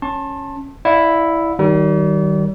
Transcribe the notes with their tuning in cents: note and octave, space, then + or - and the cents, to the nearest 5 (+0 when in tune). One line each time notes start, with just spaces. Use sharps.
C#4 -5 A5 +5 C6 +40
E4 +0 D5 +0 F5 +40
D#3 +0 G3 -40